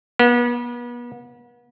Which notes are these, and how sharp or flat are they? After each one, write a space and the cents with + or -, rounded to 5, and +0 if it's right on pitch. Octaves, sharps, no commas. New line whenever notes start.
B3 -35